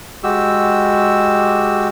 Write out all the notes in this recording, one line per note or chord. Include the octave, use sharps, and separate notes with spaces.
G#3 F#4 G4 E6